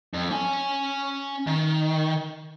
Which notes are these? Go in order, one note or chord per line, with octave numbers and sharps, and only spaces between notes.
F2
C#4 G#5
D#3